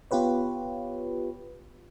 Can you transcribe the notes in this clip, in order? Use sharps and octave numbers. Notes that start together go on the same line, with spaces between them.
B3 F4 G4 B4 C#5